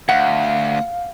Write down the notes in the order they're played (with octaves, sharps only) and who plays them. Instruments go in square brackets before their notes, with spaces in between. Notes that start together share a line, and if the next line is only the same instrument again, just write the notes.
[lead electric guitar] D2 [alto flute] F5 [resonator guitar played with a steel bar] F#5